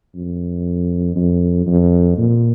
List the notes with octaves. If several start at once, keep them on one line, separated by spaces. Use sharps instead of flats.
F2
F2
F2
A#2